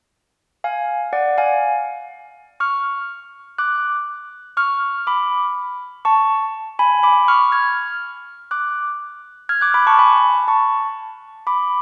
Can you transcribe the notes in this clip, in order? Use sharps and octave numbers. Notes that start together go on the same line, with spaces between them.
F5 G#5
D5 F#5
F5 G#5
C#6 F6
D6 F#6
C#6 F6
B5 D6
A5 C#6
G#5 B5
B5 D6
C#6 F6
F6 G#6
D6 F#6
F6 G#6
D6 F#6
B5 D6
A5 C#6
G#5 B5
A5 C#6
B5 D6